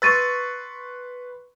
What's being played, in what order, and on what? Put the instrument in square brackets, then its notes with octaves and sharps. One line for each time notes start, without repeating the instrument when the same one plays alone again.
[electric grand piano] B4 C6 C#6 [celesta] E6 A6 D#7